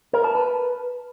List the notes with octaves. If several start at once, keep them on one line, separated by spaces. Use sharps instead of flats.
A#4
A5
B4